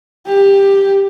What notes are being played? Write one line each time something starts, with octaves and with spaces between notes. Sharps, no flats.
G4